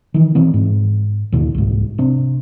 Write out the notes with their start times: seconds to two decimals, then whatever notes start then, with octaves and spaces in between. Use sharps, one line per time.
0.14 D#3 E3
0.35 B2 E3 B3 C4
0.54 G#2
1.32 D#2 B2 D3
1.55 C2 G#2
1.98 C3 C4 D4